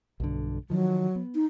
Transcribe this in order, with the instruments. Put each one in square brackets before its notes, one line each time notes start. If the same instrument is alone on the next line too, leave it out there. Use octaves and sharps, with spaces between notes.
[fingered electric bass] B1 G2 D3
[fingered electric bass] D#3 F3 [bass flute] F#3
[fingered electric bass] B3
[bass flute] D#4